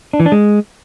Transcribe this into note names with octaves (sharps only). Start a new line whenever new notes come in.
D4
E3
D4
G#3